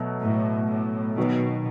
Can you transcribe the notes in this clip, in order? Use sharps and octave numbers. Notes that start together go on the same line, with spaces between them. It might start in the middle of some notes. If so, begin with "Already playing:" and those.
Already playing: B2 F#3 A3
A2
A2
B2 D#3 F#3 B3